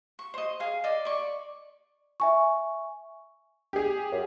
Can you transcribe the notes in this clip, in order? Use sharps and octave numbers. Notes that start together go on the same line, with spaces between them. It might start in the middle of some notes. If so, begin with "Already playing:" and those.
C#6
C5 D#5
G#4 F5
D5 D#5
D5 C#6
E5 G#5 C#6
G4 G#4
F#2